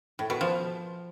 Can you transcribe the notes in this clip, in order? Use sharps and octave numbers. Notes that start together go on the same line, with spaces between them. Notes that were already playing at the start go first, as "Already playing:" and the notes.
A2
B2
F3